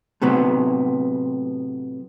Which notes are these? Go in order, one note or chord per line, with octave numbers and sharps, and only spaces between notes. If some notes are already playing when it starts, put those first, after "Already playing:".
A2 C3 F#3 B3